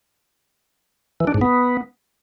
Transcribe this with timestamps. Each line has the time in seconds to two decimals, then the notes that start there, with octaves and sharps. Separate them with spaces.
1.20 E3
1.27 D4
1.34 G#2
1.41 B3